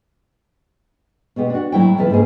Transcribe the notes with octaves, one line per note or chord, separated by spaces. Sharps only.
B2 G#3 B3 G4
D4 F#4
A2 F#3 E4 G5
E2 C3 E4 F4 A4 B4
G#2 C#3 A#3 C#4 G#4